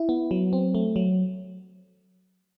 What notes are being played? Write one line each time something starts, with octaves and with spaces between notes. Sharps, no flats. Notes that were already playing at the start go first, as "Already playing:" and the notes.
Already playing: E4
B3
F#3
C4
A3
F#3